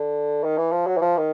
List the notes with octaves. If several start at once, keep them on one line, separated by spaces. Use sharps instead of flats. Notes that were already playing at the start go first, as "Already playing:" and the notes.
Already playing: D3
D#3
E3
F3
F#3
E3
F3
D#3